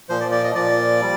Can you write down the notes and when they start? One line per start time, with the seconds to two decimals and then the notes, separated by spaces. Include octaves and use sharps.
0.09 A#2 F3 C5
0.20 D5
0.32 D5
0.44 D#5
0.55 A#2 F3 D5
1.02 G3